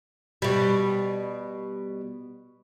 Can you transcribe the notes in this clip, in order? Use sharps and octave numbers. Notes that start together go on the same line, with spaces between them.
B2 G3